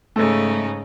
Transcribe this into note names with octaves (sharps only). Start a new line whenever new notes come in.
G#2 C#3 A3 D#4